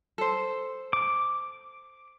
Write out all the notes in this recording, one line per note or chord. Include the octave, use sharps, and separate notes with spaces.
A4 C5
D6